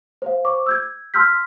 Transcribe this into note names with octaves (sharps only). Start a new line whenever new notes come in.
C5 F5
C5 C#6 D6
E6 G6 G#6
A5 C6 E6 F6 G6 B6